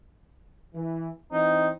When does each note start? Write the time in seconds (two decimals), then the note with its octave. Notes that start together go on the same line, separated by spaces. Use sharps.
0.75 E3
1.32 E3 C4 D#4